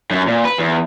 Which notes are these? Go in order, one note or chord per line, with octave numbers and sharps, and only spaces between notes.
F#2
A#2
B4
E2